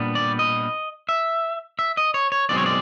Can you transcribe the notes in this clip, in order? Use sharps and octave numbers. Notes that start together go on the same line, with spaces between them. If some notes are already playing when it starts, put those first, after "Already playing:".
Already playing: A#2 G3 B3 D4
D5
D#5
E5
E5
D#5
C#5
C#5
B1 B2 G#3 C4 D5
C#5
D5